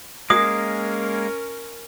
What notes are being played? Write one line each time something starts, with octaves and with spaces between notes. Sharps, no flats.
G#3 A#3 C#4 A#4 D#6